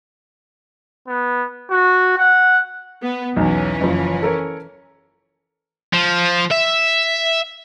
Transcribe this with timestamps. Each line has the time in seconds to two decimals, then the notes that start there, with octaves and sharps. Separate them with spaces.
1.08 B3
1.70 F#4
2.18 F#5
3.03 B3
3.36 B1 E2 E3 C#4
3.81 F#1 F3
4.23 A4 A#4 C#5
5.93 F3
6.51 E5